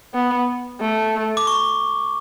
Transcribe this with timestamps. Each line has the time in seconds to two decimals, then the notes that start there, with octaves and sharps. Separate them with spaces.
0.14 B3
0.81 A3
1.37 D6
1.47 C#6